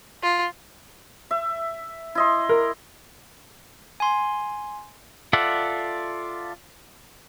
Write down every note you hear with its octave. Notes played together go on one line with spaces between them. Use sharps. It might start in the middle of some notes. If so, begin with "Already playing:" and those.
F4
E5
E4 D#5 C6
A#4
G#5 C6
F4 A4 D5 E5 F#5